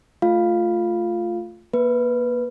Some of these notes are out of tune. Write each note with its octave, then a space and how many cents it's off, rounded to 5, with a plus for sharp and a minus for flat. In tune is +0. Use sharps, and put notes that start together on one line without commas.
A3 +0 F4 +0 F5 +0
A#3 +25 B4 -5